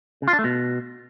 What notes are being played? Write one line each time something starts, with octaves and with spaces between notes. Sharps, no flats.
C#3
F4
D4
A3
B2